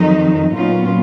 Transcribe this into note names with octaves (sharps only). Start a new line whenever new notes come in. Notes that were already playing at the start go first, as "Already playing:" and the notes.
Already playing: F2 D#3 F#3 D#4
A#2 F#3 B3 C#4 F4